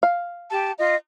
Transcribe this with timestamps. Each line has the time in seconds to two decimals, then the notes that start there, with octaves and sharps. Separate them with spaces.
0.03 F5
0.51 G4 A5
0.79 F4 D#5